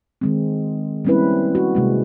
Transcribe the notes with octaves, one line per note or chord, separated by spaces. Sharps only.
D#3 G#3 C4
G3 A#3 C4 C#4 E4 B4
F#4
C3 G#3 A#3